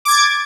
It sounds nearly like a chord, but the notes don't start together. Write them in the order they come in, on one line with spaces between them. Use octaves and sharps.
D6 G#6 A6